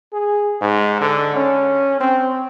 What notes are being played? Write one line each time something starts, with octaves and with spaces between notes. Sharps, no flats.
G#4
G#2
D3
C#4
C4